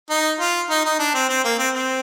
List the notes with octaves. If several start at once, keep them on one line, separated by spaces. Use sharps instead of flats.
D#4
F4
D#4
D#4
D4
C4
C4
A#3
C4
C4